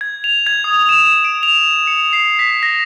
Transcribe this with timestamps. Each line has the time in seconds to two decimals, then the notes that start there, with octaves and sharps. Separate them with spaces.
0.01 G#6
0.24 F7
0.47 G#6
0.64 D#6
0.89 E7
1.24 D7
1.43 F7
1.87 C#7
2.13 C7
2.39 B6
2.63 A#6